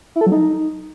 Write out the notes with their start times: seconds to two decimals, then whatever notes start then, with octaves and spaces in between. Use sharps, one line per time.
0.16 E4
0.21 A4
0.27 F#3
0.32 D#4